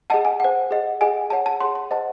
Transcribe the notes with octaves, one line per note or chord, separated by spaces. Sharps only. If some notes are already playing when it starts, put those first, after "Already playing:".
G#4 D#5 F#5 A5
G#5
C5 F#5
G#4 D#5 F#5
G#4 D#5 F#5 G#5
G#4 C#5 F#5 A5
A5
G#4 C#5 F#5 C6
C6
G#4 C5 D#5 F#5 A5